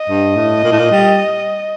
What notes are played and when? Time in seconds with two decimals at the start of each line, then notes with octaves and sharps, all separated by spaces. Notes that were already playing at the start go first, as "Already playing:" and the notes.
Already playing: D#5
0.09 G2
0.36 A2
0.63 A#2
0.71 A2
0.78 A#2
0.91 G3